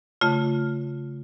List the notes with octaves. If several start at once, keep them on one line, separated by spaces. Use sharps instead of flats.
C#3 A3 F4